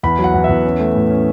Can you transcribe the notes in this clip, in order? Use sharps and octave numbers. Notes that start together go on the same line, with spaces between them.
E2 B5
F#3
F#5
E2
E2 E5
C#4
A3
A2
C#4